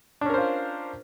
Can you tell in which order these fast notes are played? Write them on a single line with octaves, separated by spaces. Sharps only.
D4 C#4 A#4 C5 F4